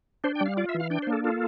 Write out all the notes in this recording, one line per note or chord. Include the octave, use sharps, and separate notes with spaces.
D4 C5
G5
G3
F5
F4 D5
E5
E3
F5
D4 G5
C5
A#3
A4
F4 A4